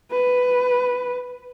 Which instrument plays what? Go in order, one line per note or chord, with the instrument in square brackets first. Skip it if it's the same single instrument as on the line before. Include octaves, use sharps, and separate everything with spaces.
[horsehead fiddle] B4